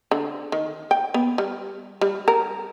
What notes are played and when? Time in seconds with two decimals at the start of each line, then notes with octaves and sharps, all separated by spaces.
0.11 D3
0.52 D#3
0.91 G5
1.14 B3
1.38 G3
2.01 G3
2.28 A#4